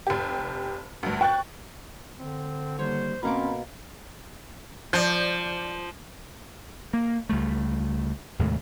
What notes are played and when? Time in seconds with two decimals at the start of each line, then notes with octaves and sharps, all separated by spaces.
0.07 F1 G4
1.03 D2 G2
1.21 G5 C#6 F#6 A6
2.19 D3 C4
2.79 D#3 G3 A#3 C5 C#5
3.23 B2 A#3 C4 C#4 A#4 A#5 B5 D6
4.93 F3 D5 G6
6.93 A#3
7.29 C#2 G3 A3
8.39 D#2 A2 C3 G#3